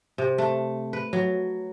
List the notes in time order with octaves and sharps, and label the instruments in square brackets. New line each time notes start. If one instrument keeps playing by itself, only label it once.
[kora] C3
A3
B4
F#3